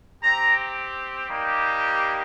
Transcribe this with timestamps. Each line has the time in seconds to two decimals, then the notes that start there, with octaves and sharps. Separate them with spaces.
0.24 C4 G4 A#5
1.29 G3 A#3 D#4 G4